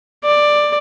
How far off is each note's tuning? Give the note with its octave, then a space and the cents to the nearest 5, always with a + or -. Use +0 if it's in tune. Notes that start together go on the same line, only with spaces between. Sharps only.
D5 +10